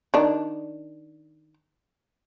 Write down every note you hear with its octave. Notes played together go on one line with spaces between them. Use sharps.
D#3 D4